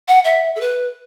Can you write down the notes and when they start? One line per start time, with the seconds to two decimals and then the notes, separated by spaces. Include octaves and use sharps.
0.08 F#5
0.24 E5
0.56 A4
0.61 B4